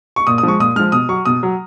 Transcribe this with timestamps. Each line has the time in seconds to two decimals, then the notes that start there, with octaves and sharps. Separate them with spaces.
0.16 C#6
0.27 A#2 D#6
0.38 D#6
0.43 F3 G#3 C#6
0.60 A#2 D#6
0.76 F3 G#3 F6
0.92 B2 D#6
1.09 F#3 C#6
1.25 B2 D#6
1.43 F#3